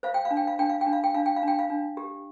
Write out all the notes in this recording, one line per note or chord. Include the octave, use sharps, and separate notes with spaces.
C5 F5
G5
F5
D4
G5
F5
D4 G5
F5
G5
D4
F5
G5
D4 F5
G5
F5
D4
G5
F5
D4
G4